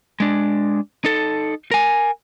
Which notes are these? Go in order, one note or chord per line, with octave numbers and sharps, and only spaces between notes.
G#3 D4
D#4 A4
A#4 G#5